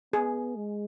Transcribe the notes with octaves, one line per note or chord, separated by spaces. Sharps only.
B3 G#4
G#3